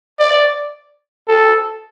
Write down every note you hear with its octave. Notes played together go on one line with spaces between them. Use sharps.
D5
A4